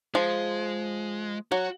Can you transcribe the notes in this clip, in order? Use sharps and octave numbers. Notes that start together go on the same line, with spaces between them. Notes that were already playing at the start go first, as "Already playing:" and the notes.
F3 G#3
F#3 F#4